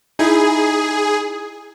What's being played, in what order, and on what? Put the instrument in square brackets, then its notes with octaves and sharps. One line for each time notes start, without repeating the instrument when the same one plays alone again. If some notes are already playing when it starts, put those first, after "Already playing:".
[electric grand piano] D#4 E4 [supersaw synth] G#4